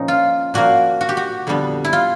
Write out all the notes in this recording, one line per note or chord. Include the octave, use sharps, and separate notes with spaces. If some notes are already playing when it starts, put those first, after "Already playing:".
Already playing: A#2 F3 A#3 C#4 D#4
F4
A#2 F3 A#3 F#4
F#4
G4
F#4
F2 D3 G3 B3
E4
F4